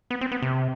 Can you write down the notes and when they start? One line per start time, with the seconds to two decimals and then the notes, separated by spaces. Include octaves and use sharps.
0.11 B3
0.21 C4
0.32 B3
0.42 C3